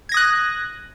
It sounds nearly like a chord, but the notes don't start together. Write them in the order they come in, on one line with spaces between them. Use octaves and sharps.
G#6 A#6 D#6 F#6